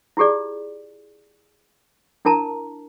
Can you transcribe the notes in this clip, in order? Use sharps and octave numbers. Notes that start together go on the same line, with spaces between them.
E4 F4 G4 G#4 D5
D4 E4 A#4 A5 A#5